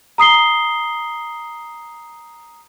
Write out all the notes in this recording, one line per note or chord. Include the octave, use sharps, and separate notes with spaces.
A#5 D#6 C7 G7